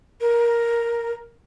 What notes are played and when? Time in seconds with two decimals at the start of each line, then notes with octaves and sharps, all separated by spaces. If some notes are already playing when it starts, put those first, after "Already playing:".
0.21 A#4